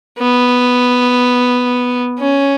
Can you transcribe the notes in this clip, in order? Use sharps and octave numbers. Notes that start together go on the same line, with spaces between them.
B3
C#4